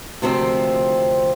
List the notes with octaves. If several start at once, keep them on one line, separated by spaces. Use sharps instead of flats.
D2 C3 D#3 F3 C4